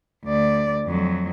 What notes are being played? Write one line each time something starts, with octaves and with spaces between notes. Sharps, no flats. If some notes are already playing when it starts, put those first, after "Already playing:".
D2 D5
F2 F#3